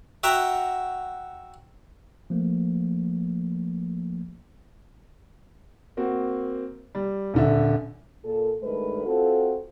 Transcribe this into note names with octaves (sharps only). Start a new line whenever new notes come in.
F#4 E5 F#5 G5 A#5
F3 A3 A#3
A#3 C4 F#4
G3
D#1 D3 E5
A#2 A4
G2 D#3 G#3 A3 A#4 B4
C4 F4 F#4 A4